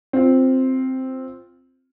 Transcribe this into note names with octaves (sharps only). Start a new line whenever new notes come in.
C4 F4